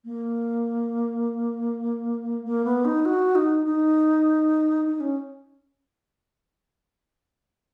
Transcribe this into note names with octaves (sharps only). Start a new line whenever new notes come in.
A#3
A#3
B3
D#4
F#4
D#4
D#4
D#4
C#4